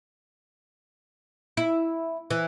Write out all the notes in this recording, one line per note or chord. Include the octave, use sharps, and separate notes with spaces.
E4
E3